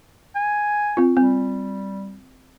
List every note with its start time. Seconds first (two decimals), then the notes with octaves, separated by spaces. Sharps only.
0.36 G#5
0.97 C4 F4
1.17 G3 C4